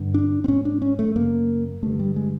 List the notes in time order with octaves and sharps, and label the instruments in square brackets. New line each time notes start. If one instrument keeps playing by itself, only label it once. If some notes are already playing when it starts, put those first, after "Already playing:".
Already playing: [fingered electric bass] G2 D3
D4
C4
G#2 C#4
D4
C#4
A3
F#2 C#3 A#3
G2 D3 A3
G3
G#3